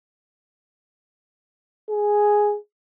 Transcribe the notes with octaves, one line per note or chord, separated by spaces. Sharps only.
G#4